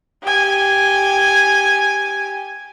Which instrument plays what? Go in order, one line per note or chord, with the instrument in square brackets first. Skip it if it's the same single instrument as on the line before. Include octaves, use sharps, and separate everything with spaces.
[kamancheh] G4 G#5